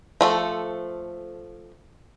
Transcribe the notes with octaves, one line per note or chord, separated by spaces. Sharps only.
F3 A3 A4